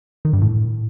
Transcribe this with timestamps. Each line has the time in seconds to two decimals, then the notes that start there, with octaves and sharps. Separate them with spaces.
0.25 D#3
0.33 G2
0.42 A2